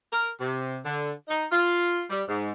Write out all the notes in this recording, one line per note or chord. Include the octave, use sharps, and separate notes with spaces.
A#4
C3
D3
D#4
F4
G3
G#2